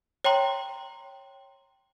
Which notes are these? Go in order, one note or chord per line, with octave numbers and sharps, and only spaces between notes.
C#5 G5 A#5 C6